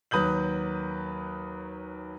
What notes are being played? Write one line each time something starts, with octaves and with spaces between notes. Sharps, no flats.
D#2 F#3 B4 D#6 G6 F#7